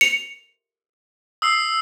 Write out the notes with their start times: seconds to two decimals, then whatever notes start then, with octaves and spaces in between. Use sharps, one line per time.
0.01 C#7 F7
1.42 D#6 E6 C7